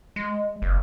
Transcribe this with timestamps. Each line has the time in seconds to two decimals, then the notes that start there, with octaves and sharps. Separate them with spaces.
0.16 G#3
0.62 F#1